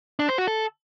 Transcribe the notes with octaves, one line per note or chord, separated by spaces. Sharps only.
D4
C5
F#4
A4